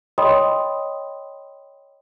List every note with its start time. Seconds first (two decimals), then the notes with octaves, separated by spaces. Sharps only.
0.18 C#5 D#5 G5 B5 C6 D#6